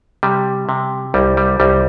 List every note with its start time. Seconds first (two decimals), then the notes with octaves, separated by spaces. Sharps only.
0.23 C3 G3
0.69 C3
1.14 C2 G3
1.37 G3
1.60 C2 G3